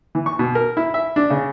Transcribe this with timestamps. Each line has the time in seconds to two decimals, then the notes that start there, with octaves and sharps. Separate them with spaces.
0.15 E3
0.26 C#6
0.39 B2
0.55 A#4
0.77 E4
0.94 E5
1.16 D4
1.30 C#3